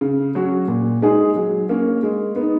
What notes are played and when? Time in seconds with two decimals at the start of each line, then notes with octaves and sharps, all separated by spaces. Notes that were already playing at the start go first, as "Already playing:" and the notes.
0.01 C#3
0.35 F#3 C#4 F#4
0.68 A#2
1.02 G#3 D#4 G#4
1.36 F#3
1.69 A#3 C#4
2.03 G#3
2.36 B3
2.41 D#4